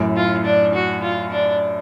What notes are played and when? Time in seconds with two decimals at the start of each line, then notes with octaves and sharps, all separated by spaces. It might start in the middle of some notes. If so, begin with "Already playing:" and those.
Already playing: F#2 A2
0.16 F4
0.45 D4
0.74 F#4
1.02 F4
1.31 D4